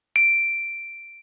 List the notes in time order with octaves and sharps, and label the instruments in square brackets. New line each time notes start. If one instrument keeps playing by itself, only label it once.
[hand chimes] D7